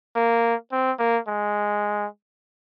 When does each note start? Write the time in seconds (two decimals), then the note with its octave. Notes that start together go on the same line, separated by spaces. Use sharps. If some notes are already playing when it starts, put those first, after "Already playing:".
0.16 A#3
0.72 C4
0.99 A#3
1.28 G#3